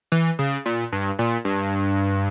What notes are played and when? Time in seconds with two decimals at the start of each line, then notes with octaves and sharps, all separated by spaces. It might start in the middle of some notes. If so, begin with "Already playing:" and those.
0.12 E3
0.39 C#3
0.66 A#2
0.92 G2
1.19 A#2
1.45 G2